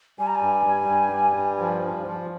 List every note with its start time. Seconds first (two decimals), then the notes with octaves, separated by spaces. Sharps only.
0.19 G3 G#5
0.27 A#5
0.35 G#5
0.42 G2
0.66 G3
0.89 G2
1.12 G3
1.36 G2
1.60 F3
1.83 F3
2.07 F3